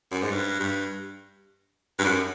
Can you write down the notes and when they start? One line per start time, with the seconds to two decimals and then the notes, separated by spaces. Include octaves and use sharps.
0.12 F#2
0.22 G#2
0.31 G2
0.60 G2
1.99 G2
2.05 F#2